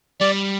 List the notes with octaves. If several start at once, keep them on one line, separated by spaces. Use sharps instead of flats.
G3 D5